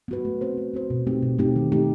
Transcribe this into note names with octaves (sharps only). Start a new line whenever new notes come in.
B3 F#4 B4
A3
C4 F#4 C5
A3
C4 F#4 C5
B2
A3 C4 D#4 G4
B2
A3 C4 D#4 G4
D#3
A3 D#4 G4